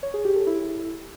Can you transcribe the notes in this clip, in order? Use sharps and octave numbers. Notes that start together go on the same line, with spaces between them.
C#5
G#4
G4
A4
E4